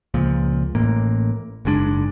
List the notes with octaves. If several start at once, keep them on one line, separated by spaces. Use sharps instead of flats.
C#2 A#2 F3
A1 A2 A#3
F#1 G#2 G#3 D4